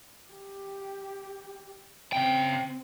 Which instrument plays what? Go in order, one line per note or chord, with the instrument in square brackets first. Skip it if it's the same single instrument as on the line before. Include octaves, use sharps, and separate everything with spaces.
[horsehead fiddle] G4
[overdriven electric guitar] C#3 G5 [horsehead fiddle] C4